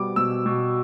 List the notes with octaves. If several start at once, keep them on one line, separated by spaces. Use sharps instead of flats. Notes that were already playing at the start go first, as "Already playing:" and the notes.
Already playing: B2 G3 B3 D6
B2 E6
B2